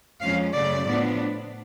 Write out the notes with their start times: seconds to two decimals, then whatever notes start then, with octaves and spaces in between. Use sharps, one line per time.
0.21 F2 F3 G#3 C#4 F5
0.54 F#2 C#3 F#3 A3 D5
0.87 A2 F3 B3 D4